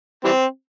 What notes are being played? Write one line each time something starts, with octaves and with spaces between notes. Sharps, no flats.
E3 G3 C4